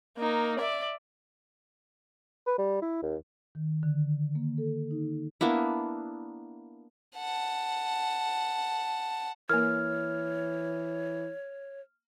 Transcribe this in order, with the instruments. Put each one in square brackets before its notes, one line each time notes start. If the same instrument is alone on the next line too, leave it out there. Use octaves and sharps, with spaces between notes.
[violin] A#3 D#4
D5 E5
[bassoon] B4
G3
E4
D#2
[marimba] D#3
D3
A#3
A4
D#4
[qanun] A#3 B3 D4 E4
[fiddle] F#5 A5
[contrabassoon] E3 [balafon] A#3 A#4 [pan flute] C#5 [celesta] F6